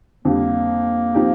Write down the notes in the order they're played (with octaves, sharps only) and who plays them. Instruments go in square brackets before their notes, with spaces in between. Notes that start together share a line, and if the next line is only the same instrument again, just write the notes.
[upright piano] F2 D3 G3 [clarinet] A#3
[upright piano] F3 C4 D#4 G4